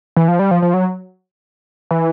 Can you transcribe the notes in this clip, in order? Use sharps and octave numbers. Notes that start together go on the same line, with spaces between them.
E3
F3
G3
F3
F3
F#3
E3